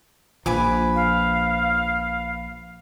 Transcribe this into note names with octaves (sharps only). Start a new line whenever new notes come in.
A#1 F3 B4 G#5 D6
F5